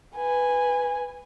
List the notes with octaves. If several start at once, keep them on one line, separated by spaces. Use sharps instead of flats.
B4 G#5